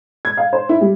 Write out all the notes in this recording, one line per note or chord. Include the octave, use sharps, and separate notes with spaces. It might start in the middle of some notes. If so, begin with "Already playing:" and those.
G#6
F5
C5
E4
G3